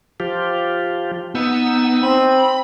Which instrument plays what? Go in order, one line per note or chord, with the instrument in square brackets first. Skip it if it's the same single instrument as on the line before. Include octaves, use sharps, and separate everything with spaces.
[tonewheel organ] F3 F4 G4
[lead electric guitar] B3 [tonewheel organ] D#4 E6
[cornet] C4 [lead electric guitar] B5